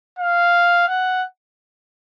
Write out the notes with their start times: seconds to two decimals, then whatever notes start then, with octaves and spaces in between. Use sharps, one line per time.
0.19 F5
0.88 F#5